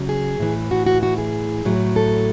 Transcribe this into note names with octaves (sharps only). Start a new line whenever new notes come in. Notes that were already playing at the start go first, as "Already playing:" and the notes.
Already playing: C#3 F#3
G#4
A2 E3
F#4
F#4
F#4
G#4
A2 F#3
A4